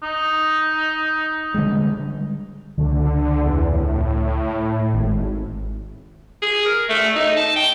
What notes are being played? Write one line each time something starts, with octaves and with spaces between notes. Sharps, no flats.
D#4
D3 G3 G#3
C#2 D3 A3
E2
A2
G#1
G#4
A#4
A3
D#4
A5
G5